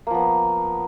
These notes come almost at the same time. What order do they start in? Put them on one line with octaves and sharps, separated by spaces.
A#3 F3 B3